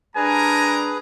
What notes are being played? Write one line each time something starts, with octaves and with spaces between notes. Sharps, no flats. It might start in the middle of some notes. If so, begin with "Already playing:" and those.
G3 D4 G#4 A#4 B4 G#5 A#5